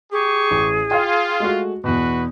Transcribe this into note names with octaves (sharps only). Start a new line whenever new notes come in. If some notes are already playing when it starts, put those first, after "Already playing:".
G4 G#4 C#6
A1
F4 F5 G5
G#3 A3 F#4
E2 B2 F#4 B4